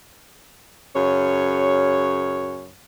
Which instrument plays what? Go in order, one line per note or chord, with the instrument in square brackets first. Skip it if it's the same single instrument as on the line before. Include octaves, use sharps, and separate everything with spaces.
[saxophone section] F#2 C#3 C#5